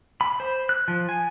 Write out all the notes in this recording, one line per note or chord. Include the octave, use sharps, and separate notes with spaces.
B5
C5
F#6
F3
G#5